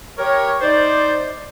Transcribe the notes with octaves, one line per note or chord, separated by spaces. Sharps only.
G4 A#4 C#5
D#4 C5 D5